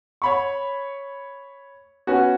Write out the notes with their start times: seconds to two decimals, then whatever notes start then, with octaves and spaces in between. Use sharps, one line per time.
0.22 C#5 B5 C#6
2.07 B3 C#4 F#4